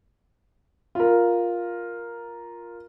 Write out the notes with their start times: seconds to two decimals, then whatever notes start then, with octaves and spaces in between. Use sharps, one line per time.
0.95 F4 A#4